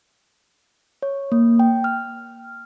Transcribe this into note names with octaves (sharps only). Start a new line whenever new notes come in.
C#5
A#3
G5
F6